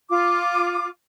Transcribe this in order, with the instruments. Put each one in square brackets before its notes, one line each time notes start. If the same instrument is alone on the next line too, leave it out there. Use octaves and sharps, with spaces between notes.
[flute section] F4 D6